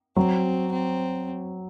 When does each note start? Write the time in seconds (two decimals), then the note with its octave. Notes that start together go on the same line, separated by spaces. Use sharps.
0.16 F#3 C4
0.72 C4